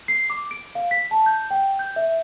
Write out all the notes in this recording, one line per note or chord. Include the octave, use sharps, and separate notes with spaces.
C7
D6
D7
F5
B6
A5
G6
G5
G6
E5